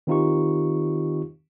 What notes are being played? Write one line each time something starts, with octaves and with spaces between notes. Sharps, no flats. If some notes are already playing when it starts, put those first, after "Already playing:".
D#3 C4 D#4 F4 G4 C#6